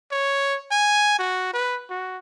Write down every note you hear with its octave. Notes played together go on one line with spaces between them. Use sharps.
C#5
G#5
F#4
B4
F#4